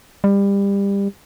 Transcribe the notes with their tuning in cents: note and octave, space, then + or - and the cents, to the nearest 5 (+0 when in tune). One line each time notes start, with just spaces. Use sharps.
G3 +25